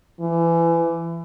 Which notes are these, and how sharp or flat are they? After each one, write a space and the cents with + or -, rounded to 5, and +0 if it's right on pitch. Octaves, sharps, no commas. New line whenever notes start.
E3 +25